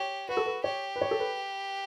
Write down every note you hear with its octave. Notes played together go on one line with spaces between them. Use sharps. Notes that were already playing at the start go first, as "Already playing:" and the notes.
Already playing: G4 C#5
F#4 B4
A4
B4
G4 C#5
B4
C#5
A4
B4